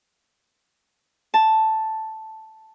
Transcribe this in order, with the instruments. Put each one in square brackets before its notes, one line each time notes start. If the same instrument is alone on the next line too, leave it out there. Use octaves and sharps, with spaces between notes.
[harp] A5